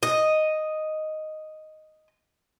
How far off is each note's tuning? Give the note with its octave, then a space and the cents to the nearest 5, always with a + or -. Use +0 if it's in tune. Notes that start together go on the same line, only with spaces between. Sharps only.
D#5 +0